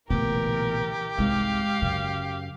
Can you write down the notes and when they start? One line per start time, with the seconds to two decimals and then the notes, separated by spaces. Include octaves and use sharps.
0.10 B1 A#2 C#3 E3 A3 B3 G4 A#4
1.18 C2 G#2 C3 G#3 F5
1.82 F#2 C#3